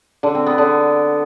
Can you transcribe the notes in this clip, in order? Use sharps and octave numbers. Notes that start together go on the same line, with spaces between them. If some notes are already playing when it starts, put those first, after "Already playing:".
D3
C4
B3
D3